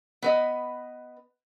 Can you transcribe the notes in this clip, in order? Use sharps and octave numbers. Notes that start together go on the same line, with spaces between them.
B3 B4 D#5